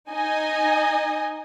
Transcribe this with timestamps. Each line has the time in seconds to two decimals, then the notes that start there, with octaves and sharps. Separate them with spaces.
0.11 D#4 D#5 G#5